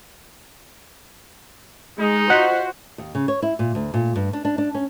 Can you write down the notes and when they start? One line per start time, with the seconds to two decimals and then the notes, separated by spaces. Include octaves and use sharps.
2.00 G#3 D#4
2.30 F4 F#4 C5 D#5 F#5 F#6 B6
2.98 D#2
3.15 C#3
3.28 C#5
3.42 E4
3.59 A#2
3.75 D2
3.94 A#2
4.16 G2
4.33 D4
4.45 D4
4.58 D4
4.75 C#4